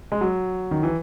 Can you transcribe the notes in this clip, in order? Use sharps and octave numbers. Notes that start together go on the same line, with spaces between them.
G#3
F#3
D#3
E3